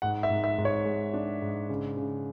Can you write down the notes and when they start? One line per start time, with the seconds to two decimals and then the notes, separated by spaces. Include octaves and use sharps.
0.02 G#2 F#5
0.23 E5
0.30 G#2
0.44 E5
0.58 G#2
0.65 C#5
0.85 G#3
1.14 D4
1.42 G#2
1.69 C#3
1.97 C#3